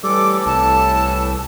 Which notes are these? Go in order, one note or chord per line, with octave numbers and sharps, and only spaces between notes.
A2 E3 G3 A4 D6
C2 A5